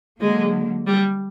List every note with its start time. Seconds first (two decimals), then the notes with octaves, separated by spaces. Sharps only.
0.20 D3 F#3 G#3 A#3
0.87 G3